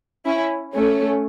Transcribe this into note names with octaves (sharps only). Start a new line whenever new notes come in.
C#4 E4
A3 C#4